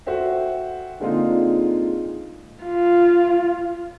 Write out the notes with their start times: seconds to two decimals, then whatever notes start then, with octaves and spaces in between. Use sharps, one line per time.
0.06 F#4 A4 C5 E5 G5
1.00 A#2 D3 G#3 C4 D#4 F4
2.63 F4